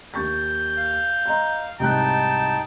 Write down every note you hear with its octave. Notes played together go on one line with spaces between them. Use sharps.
D#2 C#6 G6 A6
F5
D#5 A#5 C6
C2 G#2 D#4 G5 A5 F#6